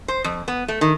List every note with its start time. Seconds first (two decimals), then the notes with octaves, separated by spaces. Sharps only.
0.08 C5
0.24 F2
0.48 B3
0.68 A3
0.81 D#3